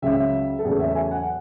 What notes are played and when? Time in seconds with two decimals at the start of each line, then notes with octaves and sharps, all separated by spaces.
0.02 C#2 C#3 F#3 E5
0.59 A4
0.65 E2 C#3 F#3 A3 G#4
0.79 E5
0.95 G#5
1.11 F#5